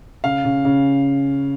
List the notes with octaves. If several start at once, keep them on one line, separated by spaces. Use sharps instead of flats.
C#3 F5
C#3
C#3